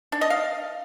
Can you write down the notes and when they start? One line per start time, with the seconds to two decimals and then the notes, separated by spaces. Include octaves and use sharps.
0.12 D4
0.21 D#5
0.30 F5